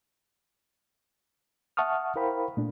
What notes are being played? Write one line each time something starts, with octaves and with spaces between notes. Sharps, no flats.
E5 F#5 A5 C#6 D#6 F6
E4 A#4 C5 F5 G5 B5
A#2 A3 D4